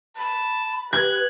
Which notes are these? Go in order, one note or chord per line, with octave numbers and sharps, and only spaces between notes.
A5 B5
G4 B4 F#6 G#6